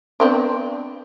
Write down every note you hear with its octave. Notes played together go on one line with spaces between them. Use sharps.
B3 C4 D4